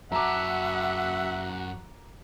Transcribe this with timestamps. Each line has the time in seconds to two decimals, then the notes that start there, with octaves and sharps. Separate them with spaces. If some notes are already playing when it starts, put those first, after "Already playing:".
0.12 F#2 F#4 E5 F#5 A5 A#5 D6